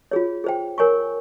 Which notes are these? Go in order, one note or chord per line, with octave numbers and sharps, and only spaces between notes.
F4 G#4 C#5
G#4 C5 G5
A#4 C#5 G#5 C#6